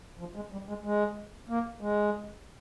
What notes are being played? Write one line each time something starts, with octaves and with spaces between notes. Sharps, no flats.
F3
G#3
G3
G#3
G#3
A#3
G#3